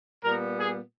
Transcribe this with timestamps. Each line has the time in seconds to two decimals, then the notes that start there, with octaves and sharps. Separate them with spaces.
0.24 A#2 G3 B3 A#4
0.59 G#4